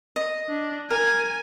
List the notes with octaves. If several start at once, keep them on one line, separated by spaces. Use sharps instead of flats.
D#5
D4
A#4 G#5